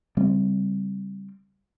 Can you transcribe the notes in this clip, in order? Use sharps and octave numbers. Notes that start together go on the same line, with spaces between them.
C#3 G3 C4